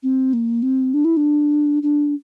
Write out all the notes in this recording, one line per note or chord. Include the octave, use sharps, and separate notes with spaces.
C4
A#3
C4
D4
E4
D4
D4